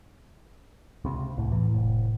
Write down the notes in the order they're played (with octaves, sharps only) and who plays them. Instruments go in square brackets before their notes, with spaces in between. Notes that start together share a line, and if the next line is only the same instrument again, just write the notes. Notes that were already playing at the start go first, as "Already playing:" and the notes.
[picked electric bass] C#2 C3
[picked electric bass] C2 [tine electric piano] A2
[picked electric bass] E2 E3
F1